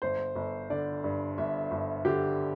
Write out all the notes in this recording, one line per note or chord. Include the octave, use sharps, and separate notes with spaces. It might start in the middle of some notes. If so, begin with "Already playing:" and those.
G1 C5
G1
D3 D5
G2
G1 E5
G1
D3 G4